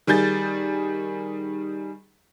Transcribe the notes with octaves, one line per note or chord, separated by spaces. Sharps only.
D#3 G3 G#4 G6 A6